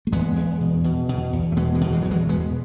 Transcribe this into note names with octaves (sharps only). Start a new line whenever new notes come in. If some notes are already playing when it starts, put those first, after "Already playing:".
A3
E2 G#3 B3
E2
B2
B2
B2
E2
A3
B2 G#3 B3
E3 G#3
B2
E3 G#3
E2 F#3
E3 G#3
B2 G#3 B3